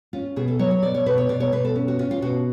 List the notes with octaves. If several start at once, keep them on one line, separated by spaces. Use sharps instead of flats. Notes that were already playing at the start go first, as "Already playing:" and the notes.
C#4 F4
B2 G#4
A4
F#3 C#5
C#5
B2 D5
C#5
B2 B4
C#5
B2 D5
C#5
B2 B4
A4
C#4
F#4
C#4 F4
F4
B2 F#4